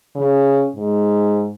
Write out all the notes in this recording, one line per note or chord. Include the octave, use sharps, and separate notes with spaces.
C#3
G#2